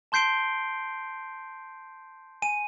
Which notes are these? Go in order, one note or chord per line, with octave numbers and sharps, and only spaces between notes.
A5 C6 G6 C7 D7 G7
G#5 D#7